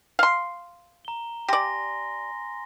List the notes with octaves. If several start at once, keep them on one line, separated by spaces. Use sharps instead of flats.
F5 C6
A#5 G7
G4 D5 G#5 C6 A#6